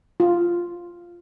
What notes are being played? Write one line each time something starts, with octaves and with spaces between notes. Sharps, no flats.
F4